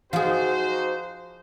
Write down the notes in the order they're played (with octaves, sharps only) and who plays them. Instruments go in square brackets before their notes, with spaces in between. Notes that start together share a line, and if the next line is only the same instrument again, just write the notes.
[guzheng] F3 G#4 [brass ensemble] D#4 F#4 C5